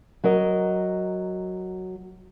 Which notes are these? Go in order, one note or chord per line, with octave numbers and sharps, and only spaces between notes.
F#3 A#4 D#5